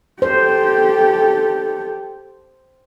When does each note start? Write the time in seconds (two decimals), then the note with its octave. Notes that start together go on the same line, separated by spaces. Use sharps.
0.22 G4 A4 C5